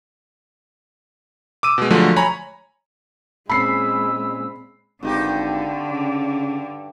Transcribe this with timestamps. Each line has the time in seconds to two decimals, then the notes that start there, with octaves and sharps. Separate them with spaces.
1.63 D6 E6 D#7
1.78 B2 G#3
1.90 D3 F3 F#3 G#3 A3
2.16 C#5 G#5 A#5 B5
3.50 A#2 G#3 C4 C#4 B5 E6 C7
5.03 G#1 G2 D3 D#4 G4
5.91 C#3